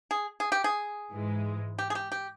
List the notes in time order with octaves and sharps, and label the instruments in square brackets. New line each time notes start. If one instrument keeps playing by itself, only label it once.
[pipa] G#4
G#4
G4
G#4
[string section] G#2 E3 G#3
[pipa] G4
G#4
G4
G4